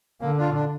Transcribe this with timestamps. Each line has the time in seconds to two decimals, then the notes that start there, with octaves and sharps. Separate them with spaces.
0.21 D3 A#3
0.38 D4 F4
0.55 D4